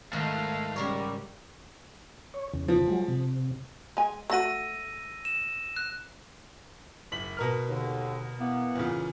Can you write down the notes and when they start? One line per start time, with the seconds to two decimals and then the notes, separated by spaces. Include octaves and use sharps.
0.13 G#2 D#3 A3 F5
0.76 C#3 G3 A#4 C#5
2.34 C#5
2.54 E2 C#3
2.68 F3
2.88 F#3 G#3
3.08 C3
3.97 G#3 G#5
4.30 A3 F#4 E6 A#6 D#7
5.25 E7
5.77 F#6
7.12 F#1 B6 F#7
7.37 B2 A#4 F6
7.69 D#2 D3
8.40 E3 A#3 B3
8.76 E2 A#2 C#3